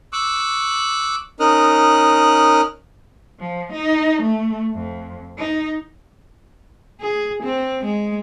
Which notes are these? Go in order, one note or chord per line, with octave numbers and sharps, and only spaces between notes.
C#6 D6 E6 F#6
C#4 D#4 A#4 D#6 F6 F#6
F3
D#4
A3
F2
D#4
G#4
C4
G#3